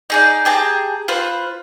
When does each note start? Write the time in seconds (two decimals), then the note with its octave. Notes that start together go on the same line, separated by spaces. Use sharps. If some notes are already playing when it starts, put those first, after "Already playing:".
0.10 D#4 G#4 D5
0.45 G4 G#4 A5 A#5
1.08 F4 B4 C5